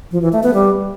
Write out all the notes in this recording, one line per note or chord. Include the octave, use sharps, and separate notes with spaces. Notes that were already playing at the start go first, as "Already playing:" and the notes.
F3
E3
A3
B3
G3